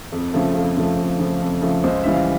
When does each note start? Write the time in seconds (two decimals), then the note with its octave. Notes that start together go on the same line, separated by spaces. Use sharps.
0.12 F2
0.34 C#3 F3 A3
0.55 F2
0.77 C#3 F3 A3
0.97 F2
1.19 C#3 F3 A3
1.40 F2
1.62 C#3 F3 A3
1.84 C#2 C5
2.03 C#3 E3 G3 E5
2.13 F5